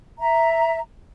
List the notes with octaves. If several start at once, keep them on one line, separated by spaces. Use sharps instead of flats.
E5 A#5